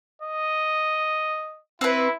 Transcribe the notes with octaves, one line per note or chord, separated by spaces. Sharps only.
D#5
C4 E4 B4